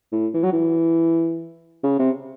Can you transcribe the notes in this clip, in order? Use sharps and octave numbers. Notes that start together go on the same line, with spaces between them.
A2
E3
F#3
E3
C#3
C3